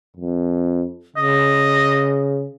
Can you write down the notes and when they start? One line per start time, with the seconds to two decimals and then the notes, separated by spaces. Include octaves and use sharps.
0.17 F2
1.17 C#3 D#5